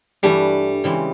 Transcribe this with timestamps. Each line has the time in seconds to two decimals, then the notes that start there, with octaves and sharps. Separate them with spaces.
0.23 G2 E3 G3 A3 D4
0.84 C#3 E3 G#3 C4